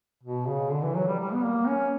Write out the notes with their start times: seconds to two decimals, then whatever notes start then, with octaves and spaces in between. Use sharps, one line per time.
0.23 B2
0.48 C#3
0.72 D3
0.83 E3
0.96 F#3
1.08 G3
1.19 G3
1.34 B3
1.44 A#3
1.67 C#4